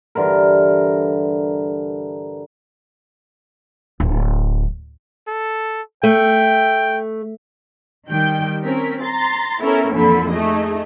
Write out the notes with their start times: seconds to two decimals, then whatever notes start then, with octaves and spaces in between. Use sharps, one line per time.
0.15 G2 D3 E3 A#4
4.00 D1
5.28 A4
6.03 A3 G5
8.09 D#3 G3 G5 G6
8.63 C4 C#4 A#4 B6
9.02 A#5 C6 A6
9.61 B3 C#4 E4 A4 A#4
9.93 F2 A#2 D3 E3 A4 B5
10.31 A3 D#4 G#4 D#5